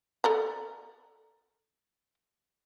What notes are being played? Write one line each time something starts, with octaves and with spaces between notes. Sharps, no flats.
A4 D5 A#5